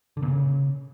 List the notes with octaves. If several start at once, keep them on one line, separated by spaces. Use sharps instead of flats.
D3
A#2
C#3